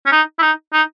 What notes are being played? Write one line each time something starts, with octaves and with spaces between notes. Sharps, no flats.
C#4
D#4
E4
D#4
D#4